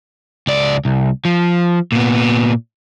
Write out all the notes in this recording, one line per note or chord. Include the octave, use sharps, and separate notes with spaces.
C#2 D5
C2
F3
A#2 B3